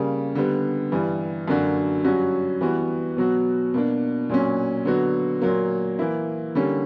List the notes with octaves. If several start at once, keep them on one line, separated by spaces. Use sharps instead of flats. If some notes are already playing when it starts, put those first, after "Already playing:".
Already playing: C#3 G3 A#3
D3 G3 B3
G2 E3 G3
F#2 D3 A#3 D4 F#4
G2 F#3 C#4 F#4
E3 G3 B3 F#4
B2 F#3 B3 F#4
B2 A#3 D4
A#2 F#3 C#4
D3 F#3 B3 F#4
A#2 F#3 A#3
E3 A#3 E4
D3 G3 A#3 C#4